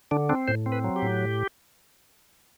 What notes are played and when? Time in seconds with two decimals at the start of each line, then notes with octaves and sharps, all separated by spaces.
0.11 D3 D4
0.29 C4 D4
0.48 A2 C5
0.66 C4
0.72 B4
0.84 F#3
0.96 G4
1.02 A2